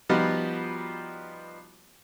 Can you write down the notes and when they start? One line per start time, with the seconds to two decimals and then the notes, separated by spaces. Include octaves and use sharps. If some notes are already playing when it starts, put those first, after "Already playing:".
0.09 F3 G3 B3 D#4 F4 F#4